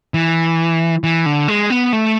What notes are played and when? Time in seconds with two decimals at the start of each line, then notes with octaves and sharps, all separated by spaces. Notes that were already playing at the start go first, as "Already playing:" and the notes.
0.14 E3
1.04 E3
1.26 D3
1.48 G#3
1.70 B3
1.93 A3